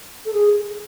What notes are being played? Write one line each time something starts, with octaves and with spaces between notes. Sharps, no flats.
A4
G#4